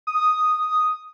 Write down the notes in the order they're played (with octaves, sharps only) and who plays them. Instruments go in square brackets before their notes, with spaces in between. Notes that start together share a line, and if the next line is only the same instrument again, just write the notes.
[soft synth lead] D#6